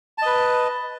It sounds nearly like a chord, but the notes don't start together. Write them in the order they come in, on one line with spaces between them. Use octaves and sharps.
A5 D#5 B4